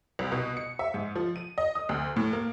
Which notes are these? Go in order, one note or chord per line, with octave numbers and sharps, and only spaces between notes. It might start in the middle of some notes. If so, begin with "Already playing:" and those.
C2
B2
C#7
E5
G#2
F3
D#7
D#5
D#6
D2
A2
A#3